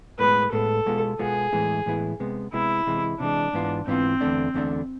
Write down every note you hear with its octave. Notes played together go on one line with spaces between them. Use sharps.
A2 G#3 B3 B4
A2 G#3 B3 A4
B2 G#3 B3 F4
B2 G#3 B3 F4 G#4
A2 E3 G#3 B3 E4
A2 E3 G#3 B3 E4
C3 G#3 B3
C3 G#3 B3 E4
C3 E3 G#3
C3 E3 G#3 D4
G#2 E3 B3 F4
G#2 E3 B3 C4 F4
E2 D3 A3 D4
E2 D3 A3 D4